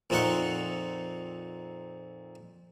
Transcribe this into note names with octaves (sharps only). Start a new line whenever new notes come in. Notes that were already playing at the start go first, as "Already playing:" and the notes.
F2 A#2 C4 D#4 F#5 C#6